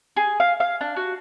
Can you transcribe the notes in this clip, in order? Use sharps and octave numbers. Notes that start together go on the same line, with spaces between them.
G#4
F5
F5
D4
F#4